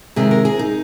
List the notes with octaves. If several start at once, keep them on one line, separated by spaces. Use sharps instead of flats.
C3 D#3 G#3 G#4
A#4
G#4
D#4